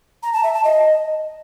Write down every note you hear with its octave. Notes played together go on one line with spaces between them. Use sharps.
A#5
A5
E5
A5
D#5